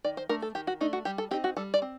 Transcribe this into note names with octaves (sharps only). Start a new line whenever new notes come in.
D#3 D5
C5
A3 D4 A#4
A4
D#3 G4
F#4
A3 D4 D#4
F#4
G3 G4
A4
C4 D#4 G4
F#4
G3 A4
D5
C4